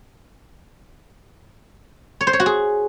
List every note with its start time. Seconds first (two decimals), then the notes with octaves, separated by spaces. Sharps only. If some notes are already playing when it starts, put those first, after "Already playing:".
2.21 C#5
2.27 C5
2.33 C#5
2.40 F#4
2.46 G#4